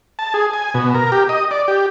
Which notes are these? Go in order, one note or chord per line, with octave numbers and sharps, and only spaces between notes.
A5
G#4
G#5
B2
A#4
G4
D#5
D5
G4